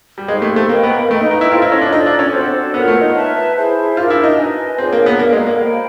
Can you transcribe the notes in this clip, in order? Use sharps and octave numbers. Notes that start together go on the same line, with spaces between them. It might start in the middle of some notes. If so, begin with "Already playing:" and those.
G3
G#3 D#4 G4 C5 F5
A3
A3
A#3 B4 D#5 G5 B5
B3
A#3
A3 B4 D#5 G5 A#5
D#4
D#4
E4
F4 A4 C5 D#5
E4
C#4
D4
D#4 F4 A4 D5
D4
C#4
C4 D4 F#4 A4 C5
B3 F4 A#4 C#5 F#5
A3
D#4
B4 E5 A5
E4 G#4 C5 E5
D4 F4 F#4 A#4
E4
D#4
B4 D#5 G#5
C4 D4 F4 G#4 C#5
A#3
B3
A#3 F#4 A4 D5
G#3
A#3
C5 D#5 G5 B5